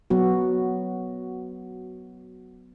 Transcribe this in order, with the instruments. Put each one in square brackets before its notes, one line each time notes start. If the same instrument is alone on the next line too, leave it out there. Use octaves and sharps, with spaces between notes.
[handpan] F#3 B3 F#4